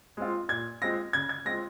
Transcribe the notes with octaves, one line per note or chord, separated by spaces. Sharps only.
G#3 C4 F4
A#2 G#6
G#3 C4 F4 A#6
C#3 G#6
G#6
G#3 C4 F4 A#6